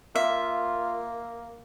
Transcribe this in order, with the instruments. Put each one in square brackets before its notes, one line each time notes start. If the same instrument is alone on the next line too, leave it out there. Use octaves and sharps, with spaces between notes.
[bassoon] A#3 [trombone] F4 [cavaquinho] E5